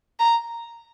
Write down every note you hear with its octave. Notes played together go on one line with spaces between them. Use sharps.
A#5